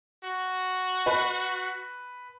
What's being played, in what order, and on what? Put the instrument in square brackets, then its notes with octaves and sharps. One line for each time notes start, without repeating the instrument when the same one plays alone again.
[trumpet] F#4
[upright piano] B4